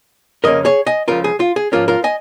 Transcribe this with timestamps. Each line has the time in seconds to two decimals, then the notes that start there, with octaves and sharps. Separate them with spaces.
0.44 F2 C#3 A#3 C#4 A#4 D#5
0.65 G#4 C#5
0.87 D#5 G#5
1.08 C#2 C#3 F3 F4 A#4
1.24 G#4
1.40 F4
1.56 G#4
1.72 G#2 F3 A#3 C#4 F4 A#4
1.88 F4 A#4
2.04 D#5 G#5